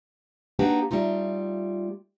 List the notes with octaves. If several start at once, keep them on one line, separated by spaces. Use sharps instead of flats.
A#3 D4 D#4 F#4 G4 B4
G3 A3 D#4 F4